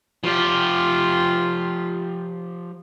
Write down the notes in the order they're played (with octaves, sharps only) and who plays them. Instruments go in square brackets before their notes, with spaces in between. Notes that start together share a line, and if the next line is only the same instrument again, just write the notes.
[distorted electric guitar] F3 G4 [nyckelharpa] F4